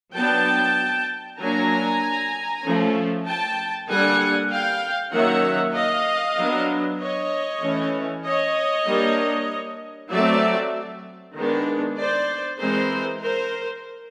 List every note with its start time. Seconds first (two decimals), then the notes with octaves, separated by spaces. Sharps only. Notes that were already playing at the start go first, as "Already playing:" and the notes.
0.15 F#3 B3 D4 G5 A5
1.39 F#3 A#3 D4 G#5 A#5
2.63 F3 A3 C#4
3.26 G5 A5
3.88 D3 G3 A#3 F#5 G#5
4.50 F5 G5
5.12 D#3 F#3 A#3 C#4 E5 F#5
5.75 D#5 F5
6.37 F#3 B3 D4
7.00 C#5 D#5
7.62 E3 A3 C#4
8.24 C#5 D#5
8.85 G3 A#3 D4
10.10 F#3 A3 C4 D5 E5
11.35 D#3 G#3 B3 D4
11.96 C5 D5
12.59 E3 G#3 C4 A#4 C5
13.22 A#4 C5